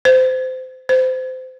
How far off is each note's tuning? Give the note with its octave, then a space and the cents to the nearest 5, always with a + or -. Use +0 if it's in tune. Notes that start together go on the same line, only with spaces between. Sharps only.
C5 -25
C5 -25